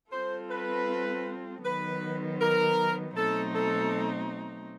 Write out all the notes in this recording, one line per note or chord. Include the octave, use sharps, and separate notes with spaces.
G3 C4 F4 A4 C5
B4
D#3 F#3 B3 B4
A#4
B2 F#3 A3 C4 D#4 A4
A4